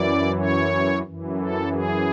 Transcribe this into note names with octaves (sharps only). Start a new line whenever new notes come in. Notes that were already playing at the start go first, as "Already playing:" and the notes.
Already playing: F#2 E3 D5
C#5
F#2 E3
A4
G#4